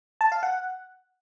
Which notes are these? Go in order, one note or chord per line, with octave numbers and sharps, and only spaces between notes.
A5
F5
F#5